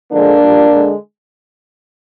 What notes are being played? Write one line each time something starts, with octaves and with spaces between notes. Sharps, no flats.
D3 F3 G#3 A#3 D4
A#2 G3
D3 G#3